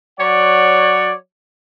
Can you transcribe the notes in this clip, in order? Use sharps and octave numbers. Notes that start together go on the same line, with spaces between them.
F#3 C#5 D5 F#5